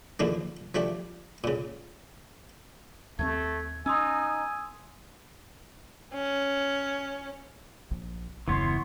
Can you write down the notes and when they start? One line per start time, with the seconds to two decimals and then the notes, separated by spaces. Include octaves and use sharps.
0.20 D#2 G#2 D3 F3 A#3
0.75 F3 A3 D4 G4
1.44 A#2 C#3
3.19 D#2 G3 A3 C4 G#6
3.86 C#4 D#4 G#5 C6 D#6 E6
6.14 C#4
7.91 A#1
8.48 D#1 F#2 C#3 E3 B3 C#5 C6